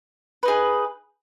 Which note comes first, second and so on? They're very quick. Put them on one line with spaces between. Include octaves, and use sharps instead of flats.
B4 D#4 G#4